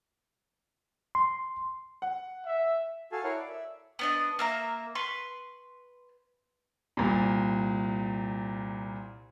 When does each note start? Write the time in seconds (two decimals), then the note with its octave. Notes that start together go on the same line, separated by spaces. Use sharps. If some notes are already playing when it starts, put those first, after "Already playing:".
1.15 C6
2.02 F#5
2.46 E5
3.12 F#4 A4 F5 G#5 A5
3.24 E4 A#4 C#5 F5 F#5
3.36 D5
3.49 E5
3.99 B3 D4 D#5
4.39 A#3 E5 A#5
4.95 B4 C6 C#6
6.97 C2 A#2